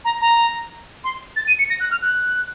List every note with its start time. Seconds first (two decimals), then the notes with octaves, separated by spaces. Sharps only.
0.05 A#5
0.21 A#5
1.04 C6
1.36 A6
1.48 D#7
1.59 C#7
1.70 A#6
1.80 F#6
1.91 F6
2.02 F#6